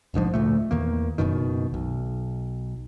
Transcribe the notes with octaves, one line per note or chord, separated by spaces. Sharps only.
F1 A#1 G#2 F3
D2 A#2 A3
E2 D#3 A#3
F#1 F#2 B2 D#3
B1